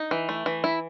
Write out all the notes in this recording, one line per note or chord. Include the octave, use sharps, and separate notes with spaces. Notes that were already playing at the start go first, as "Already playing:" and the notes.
Already playing: D#4
E3
A3
E3
E4